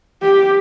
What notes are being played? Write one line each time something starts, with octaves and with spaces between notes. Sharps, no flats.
G4